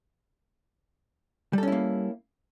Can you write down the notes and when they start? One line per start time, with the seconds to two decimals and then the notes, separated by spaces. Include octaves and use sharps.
1.53 G3
1.58 A4
1.63 C#4
1.68 E4
1.72 A#3